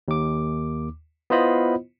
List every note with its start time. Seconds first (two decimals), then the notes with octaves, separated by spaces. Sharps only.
0.08 D#2 D6
1.30 B3 E4 F4 C5 D#5 B5